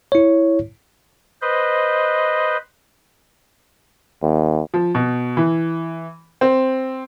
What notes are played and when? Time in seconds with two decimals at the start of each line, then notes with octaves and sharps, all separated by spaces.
0.12 E4 C#5
1.42 B4 C5 D#5
4.23 D#2
4.74 F3
4.95 B2
5.37 E3
6.41 C4